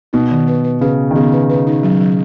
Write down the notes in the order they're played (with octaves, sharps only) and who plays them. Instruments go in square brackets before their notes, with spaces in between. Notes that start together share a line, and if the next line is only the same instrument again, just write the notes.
[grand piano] B2 [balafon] D#4
[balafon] D#3
B4
B4
[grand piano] C#3 [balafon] B4
[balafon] G#4
[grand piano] D#3
[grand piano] C#3 [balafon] B3
[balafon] B4
B4
D#4
F#3
F#3